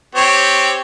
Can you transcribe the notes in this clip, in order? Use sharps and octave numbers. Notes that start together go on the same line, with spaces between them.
C4 G4 C#5